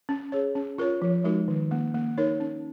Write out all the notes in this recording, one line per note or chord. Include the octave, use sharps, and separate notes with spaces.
C#4
G#4 C#5
C#4
F4 A#4 C#5
F3
G#3 D#4 F#4 A#4
D#3
A#3 C#4
A#3
D#4 A#4 C#5
C#4